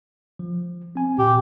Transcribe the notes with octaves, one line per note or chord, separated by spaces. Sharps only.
F3
C4 G#5
A#2 G4